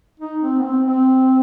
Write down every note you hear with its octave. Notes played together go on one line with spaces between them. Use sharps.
D#4
C4
B3
C4
C4